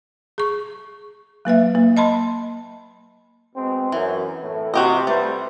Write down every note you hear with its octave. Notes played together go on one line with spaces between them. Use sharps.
G#4 C#6
F#3 A#3 B4 E5
A#3
D#5 A5 B5 C6
B2 G#3 C4
F#2 E3
A2
C3 F#4 G4 D#5
G3 A3 C4 B4